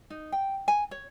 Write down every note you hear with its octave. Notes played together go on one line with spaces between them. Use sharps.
D#4
G5
G#5
C#5